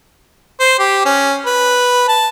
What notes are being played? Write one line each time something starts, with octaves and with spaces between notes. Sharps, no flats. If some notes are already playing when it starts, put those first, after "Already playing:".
C5
G4
C#4
B4
A5